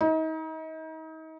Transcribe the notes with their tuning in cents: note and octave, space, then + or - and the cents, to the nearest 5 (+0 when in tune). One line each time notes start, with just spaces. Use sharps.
D#4 +35